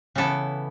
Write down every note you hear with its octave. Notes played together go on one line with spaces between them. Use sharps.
C#3 E3 B3 E4 A4